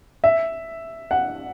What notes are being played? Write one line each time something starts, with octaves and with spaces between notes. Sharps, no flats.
E5
F#5